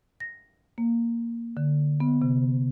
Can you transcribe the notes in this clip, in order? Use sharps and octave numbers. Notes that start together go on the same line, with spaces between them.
A#6
A#3
D3
B3
C3